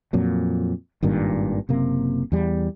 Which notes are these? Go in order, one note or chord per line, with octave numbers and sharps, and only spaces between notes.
F2 A#2 F#3
G#1 G2 A#2 D#3
F#1 C3 A#3
E2 G3